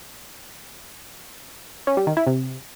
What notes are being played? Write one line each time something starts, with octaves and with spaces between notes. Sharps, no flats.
C#4
G3
D#3
E4
C3